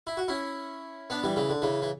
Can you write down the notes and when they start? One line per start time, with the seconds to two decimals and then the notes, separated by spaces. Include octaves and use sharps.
0.07 E4
0.17 F#4
0.28 C#4 E4
1.10 B3 D4
1.23 E3 G3
1.36 C#3 E3
1.49 D3
1.62 C#3 E3
1.82 E3